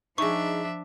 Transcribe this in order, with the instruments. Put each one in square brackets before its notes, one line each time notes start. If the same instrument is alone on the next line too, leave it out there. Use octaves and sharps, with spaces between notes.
[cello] F3 E5 [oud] G#3 D#4 [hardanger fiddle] D4 [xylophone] C#6